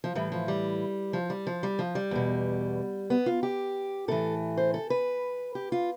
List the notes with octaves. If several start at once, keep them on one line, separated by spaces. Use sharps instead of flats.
F3
A2 E3 G3
F3
G3
F3
G3
F3
G3
F3
G3
E2 B2
B3
F4
G4
A2 E3 A4
C5
A4
B4
G4
F4